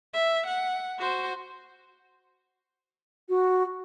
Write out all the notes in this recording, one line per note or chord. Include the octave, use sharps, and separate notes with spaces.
E5
F#5
F#4 C5
F#4